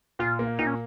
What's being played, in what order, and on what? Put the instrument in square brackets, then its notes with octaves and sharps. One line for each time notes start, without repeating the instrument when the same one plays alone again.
[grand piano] A#2 [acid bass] F4
[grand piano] A#3
[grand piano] A#2 [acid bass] D#4
[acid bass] C#4